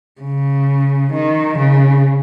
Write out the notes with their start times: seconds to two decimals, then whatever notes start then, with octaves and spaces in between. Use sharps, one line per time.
0.21 C#3
1.13 D#3
1.58 C#3